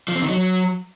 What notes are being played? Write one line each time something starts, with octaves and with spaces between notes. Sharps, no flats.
F3
C4
D#3
F#3